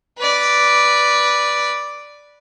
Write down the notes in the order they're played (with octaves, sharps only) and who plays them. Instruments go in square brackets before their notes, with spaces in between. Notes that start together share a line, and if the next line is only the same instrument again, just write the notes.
[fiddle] B4 D5